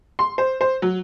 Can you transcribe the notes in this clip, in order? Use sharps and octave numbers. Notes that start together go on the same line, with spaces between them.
C6
C5
C5
F#3